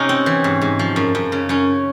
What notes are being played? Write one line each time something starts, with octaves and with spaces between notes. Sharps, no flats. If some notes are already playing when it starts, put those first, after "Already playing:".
Already playing: C3 C#4 D#4
C4
E3
G#2
G#2
F3
F#2
F#2
C#3
F#2 C#4